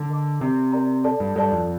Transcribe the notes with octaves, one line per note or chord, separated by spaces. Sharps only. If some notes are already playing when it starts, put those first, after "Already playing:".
Already playing: D3
A#4 D#5 A5 D6
C3 A#4 D5 G5 A#5
A#4 D5 G5 A#5
A4 D5 A5
G2
G2 A4 D5 A5
F2